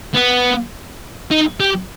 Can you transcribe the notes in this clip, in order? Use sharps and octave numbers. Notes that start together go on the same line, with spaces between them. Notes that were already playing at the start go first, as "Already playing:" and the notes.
B3
D#4
G4